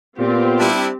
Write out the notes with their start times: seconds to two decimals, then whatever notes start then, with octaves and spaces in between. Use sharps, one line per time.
0.19 A#2 B3 C4 F4 G4
0.59 G3 D4 E4